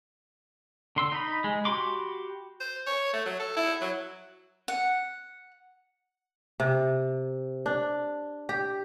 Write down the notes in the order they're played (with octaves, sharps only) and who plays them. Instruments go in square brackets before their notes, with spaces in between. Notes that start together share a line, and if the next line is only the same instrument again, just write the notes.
[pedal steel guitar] D3 C6 E6
D#4 B5
G#3
F#4 G4 B5 C6 D6
[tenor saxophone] C5
C#5
A3
F#3
A4
E4
F#3
[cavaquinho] F#5
[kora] C3
D4
G4